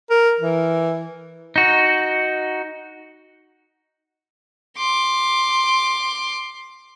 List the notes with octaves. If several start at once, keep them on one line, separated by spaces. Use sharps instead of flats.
A#4
E3
D#4 F#4
C6 D6